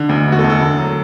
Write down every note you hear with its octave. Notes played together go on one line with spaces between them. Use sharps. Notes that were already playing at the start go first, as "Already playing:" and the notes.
Already playing: D3
D2
E1 F#4
A4
D2
A4
D2
F#3